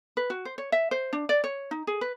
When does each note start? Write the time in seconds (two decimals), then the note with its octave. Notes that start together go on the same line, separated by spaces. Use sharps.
0.17 B4
0.30 F#4
0.45 C5
0.58 C#5
0.72 E5
0.91 C5
1.13 D4
1.29 D5
1.44 C#5
1.71 D#4
1.87 G#4
2.01 B4